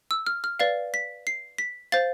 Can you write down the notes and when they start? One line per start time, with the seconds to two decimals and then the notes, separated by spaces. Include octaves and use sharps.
0.11 E6
0.27 F6
0.44 F6
0.59 B4 D5 F5 A6
0.94 B6
1.27 C7
1.58 B6
1.92 C5 F5 A6